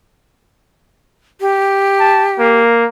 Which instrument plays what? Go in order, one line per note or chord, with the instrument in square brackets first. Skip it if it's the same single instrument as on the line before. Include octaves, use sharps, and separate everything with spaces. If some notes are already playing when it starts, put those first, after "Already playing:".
[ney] G4
[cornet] A5
A#3